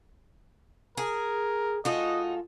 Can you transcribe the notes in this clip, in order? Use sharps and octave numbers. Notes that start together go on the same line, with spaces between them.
G#4 A#4
G#3 D#4 F4 F#4 A4 D#5